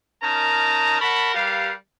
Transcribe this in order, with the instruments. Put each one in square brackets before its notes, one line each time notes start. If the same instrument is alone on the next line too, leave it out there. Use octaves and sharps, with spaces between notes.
[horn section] D#3 C#4 A#4 D#5 A5 A#5
A#4 C#5 F#5 A5 B5
G3 G4 A#4 B4 F5